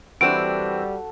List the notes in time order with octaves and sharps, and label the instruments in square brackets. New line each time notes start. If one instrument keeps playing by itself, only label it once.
[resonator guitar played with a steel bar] E3 C4 D4 [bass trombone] G3 [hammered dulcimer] F#4 A4 [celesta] D7